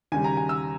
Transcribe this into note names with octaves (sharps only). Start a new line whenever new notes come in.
D#2 C#3 G3 G#5
A#5
G#5
E6